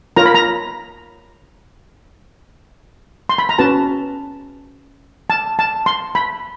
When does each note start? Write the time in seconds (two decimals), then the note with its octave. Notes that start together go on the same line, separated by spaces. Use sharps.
0.16 F4 A#4 C#5 A#5
0.26 B5
0.34 A#5
3.29 C6
3.38 B5
3.49 A#5
3.59 C#4 F#4 B4 A5
5.30 A5
5.59 A5
5.86 C6
6.15 B5